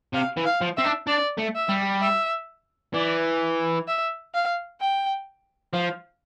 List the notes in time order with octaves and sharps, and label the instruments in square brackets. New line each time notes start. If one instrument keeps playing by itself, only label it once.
[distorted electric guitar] C3 [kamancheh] F5
[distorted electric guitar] E3
[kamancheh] F5
[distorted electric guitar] F3
[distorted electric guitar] C4 [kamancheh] E5
[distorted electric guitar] D4
[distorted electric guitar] D4 [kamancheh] D5
[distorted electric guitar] A3
[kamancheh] E5
[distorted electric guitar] G3
[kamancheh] E5
[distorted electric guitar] E3 [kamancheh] D5
[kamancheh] E5
F5
G5
[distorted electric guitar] F3 [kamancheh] F5